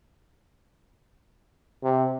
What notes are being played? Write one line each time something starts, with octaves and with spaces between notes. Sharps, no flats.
C3